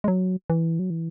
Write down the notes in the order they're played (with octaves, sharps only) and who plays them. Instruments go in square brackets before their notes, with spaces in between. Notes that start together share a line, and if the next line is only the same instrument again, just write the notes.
[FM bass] G#3
F#3
E3
F#3
E3